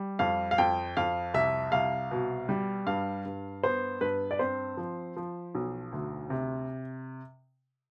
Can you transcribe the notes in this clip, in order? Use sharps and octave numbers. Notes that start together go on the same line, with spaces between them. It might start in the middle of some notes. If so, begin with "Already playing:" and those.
Already playing: G3
F2 F5
F5
F2 G5
F2 F5
C2 E5
C2 F5
B2
G3
G2 F5
G2
B3 C5
G2 B4
D5
C4 C5
F3
F3
B1
D2
C3